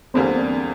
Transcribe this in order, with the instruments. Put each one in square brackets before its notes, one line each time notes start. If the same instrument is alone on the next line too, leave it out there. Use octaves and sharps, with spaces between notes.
[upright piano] E2 D3 G3 A#3 [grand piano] C4
[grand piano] D4